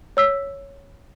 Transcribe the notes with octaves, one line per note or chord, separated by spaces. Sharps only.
C#5 E6 B6